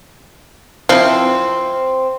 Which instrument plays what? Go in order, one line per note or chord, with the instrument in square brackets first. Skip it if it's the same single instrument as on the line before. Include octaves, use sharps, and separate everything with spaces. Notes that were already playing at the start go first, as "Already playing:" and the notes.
[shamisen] F3 E4 [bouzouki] C4